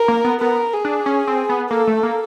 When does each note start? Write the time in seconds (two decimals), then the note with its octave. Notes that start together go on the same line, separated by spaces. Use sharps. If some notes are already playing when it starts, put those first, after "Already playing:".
Already playing: A#4
0.08 A#3
0.24 B3
0.41 B3 A#4
0.73 G#4
0.85 D4
1.06 C#4
1.28 C4
1.49 B3
1.70 A#3 A4
1.87 A3
2.03 A#3